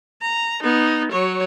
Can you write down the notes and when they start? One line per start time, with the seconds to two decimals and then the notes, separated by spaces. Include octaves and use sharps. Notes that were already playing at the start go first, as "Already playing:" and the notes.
0.22 A#5
0.63 B3 D#4
1.12 F#3 C#5